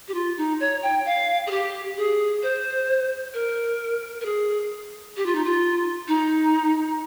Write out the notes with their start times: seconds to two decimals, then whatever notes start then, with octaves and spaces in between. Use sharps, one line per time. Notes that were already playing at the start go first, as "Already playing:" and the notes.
0.08 G4
0.14 F4
0.37 D#4
0.60 C#5
0.83 G5
1.06 F5
1.47 G#4
1.51 G4
1.97 G#4
2.43 C5
3.34 A#4
4.21 A#4
4.25 G#4
5.17 G4
5.26 F4
5.35 D#4
5.44 F4
6.08 D#4